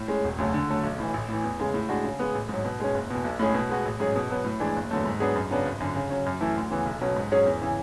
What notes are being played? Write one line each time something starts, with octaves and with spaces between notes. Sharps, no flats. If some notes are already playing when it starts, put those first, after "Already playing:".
Already playing: A2
G#3 C#4
E1
D2 C#3 F#3 A3
D3
F#3 A3
B1
A2 E3
A1
A2 E3
E2
C#3 G#3
A2
G#3 D4 F#4
C#3
G#3 B3
A1
G#2 F#3
B2
G#3 C#4
F#1
E2 B2
B1
A2 G#3 C#4 G#4
B2
G#3 B3 F#4
A1
G#2 F#3 C#4 G#4
B2
F#3 B3
A2
E3 G#3 D4
F#1
E2 D3 F#3 A3
G#2
F#3 B3 D4 G#4
F#2
C#3 F#3 B3 D4
G#1
F#2 D3
C#3
F#3 C#4
F#2
E3 A3 E4
D2
C#3 E3 B3
B1
B2 F#3 C#4
G#2
F#3 C#4 G#4 C#5
E2
C#3 E3